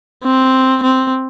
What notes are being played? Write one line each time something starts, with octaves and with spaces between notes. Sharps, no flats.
C4
C4